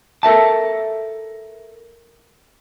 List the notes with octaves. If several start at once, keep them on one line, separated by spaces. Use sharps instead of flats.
A4 A#4 E5 A5